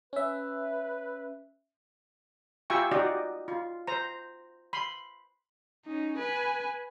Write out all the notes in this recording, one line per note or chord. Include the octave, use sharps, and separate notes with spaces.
C#4 B4 E5
F4 G4 E5 G5 G#5 C#6
D#4 F#4 G4 D5 D#5
F4
C5 A#5
B5 C6
C#4 D#4
B4 G#5